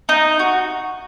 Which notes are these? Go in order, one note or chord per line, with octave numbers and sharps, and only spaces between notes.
D#4
F#4